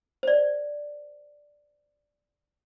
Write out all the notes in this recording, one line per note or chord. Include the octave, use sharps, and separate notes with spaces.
C5 D5